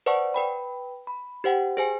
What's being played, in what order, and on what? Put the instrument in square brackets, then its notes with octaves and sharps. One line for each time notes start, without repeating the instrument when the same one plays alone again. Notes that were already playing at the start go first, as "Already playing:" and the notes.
[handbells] B4 C5 D5 F#5 A5 C#6
B4 G5 B5
B5
G4 C5 F#5 G5
G#4 C5 G#5